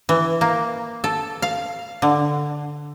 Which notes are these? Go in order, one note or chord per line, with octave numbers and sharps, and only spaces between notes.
E3
A#3
A4
F5
D3